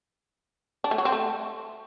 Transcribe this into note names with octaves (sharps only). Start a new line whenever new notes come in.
D4
A3
F#3
C4
A3